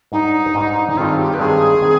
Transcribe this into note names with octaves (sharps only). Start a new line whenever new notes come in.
G#2 G3 D4 D#4
G#2 G3 D4
D#4
G2 D#3 G#3 C4 F4
G4
B4
G2 D#3 G#3 C4 G#4
D#3 G#3 C4